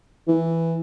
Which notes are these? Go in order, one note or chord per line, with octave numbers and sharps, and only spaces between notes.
E3